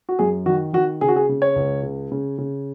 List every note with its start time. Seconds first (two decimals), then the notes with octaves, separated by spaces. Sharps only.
0.09 F#4
0.19 F#2 G#4
0.46 D#3 F#4
0.73 D#3 F#4
1.01 C#3 G#4
1.08 F#4
1.16 G#4
1.29 C#3
1.42 C#5
1.56 C#2
1.83 C#3
2.11 C#3
2.38 C#3